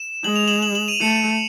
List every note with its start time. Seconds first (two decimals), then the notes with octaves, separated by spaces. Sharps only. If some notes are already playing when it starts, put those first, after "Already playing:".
Already playing: E7
0.24 G#3 F#7
0.36 F7
0.48 E7 F#7
0.62 E7 F#7
0.75 E7 F#7
0.88 D#7 F7
1.01 A3 C#7 D#7